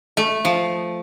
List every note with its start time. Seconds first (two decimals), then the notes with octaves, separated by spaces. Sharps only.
0.17 A3
0.45 F3